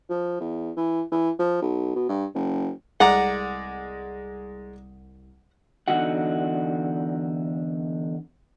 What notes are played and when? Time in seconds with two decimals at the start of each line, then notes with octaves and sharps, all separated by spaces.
0.10 F3
0.40 E2
0.77 E3
1.12 E3
1.39 F3
1.62 B1
1.96 B2
2.09 G2
2.35 F#1
3.00 C2 G#3 D5 F#5 A#5
5.88 E2 D3 F3 D#4 F#4 F#5